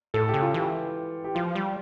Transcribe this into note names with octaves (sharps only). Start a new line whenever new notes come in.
A2 A4
G4
C#3
F4
E3 G4
G4
F3 F4
G3